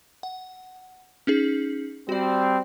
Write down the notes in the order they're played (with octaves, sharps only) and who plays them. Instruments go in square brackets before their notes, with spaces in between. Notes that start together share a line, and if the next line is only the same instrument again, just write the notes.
[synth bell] F#5
C#4 D#4 G#4
[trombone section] G3 C4 [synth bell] F#4 D5